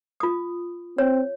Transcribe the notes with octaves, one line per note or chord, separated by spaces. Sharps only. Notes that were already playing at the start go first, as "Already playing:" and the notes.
F4 D#6
C4 C#5